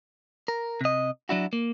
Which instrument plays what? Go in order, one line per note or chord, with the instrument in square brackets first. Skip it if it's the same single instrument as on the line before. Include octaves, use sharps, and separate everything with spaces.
[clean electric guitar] A#4
C3 D#5
F#3 D4 E4 F#4
A#3